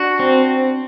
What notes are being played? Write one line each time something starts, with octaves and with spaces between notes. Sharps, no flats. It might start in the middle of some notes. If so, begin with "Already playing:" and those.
Already playing: D4 F#4
C4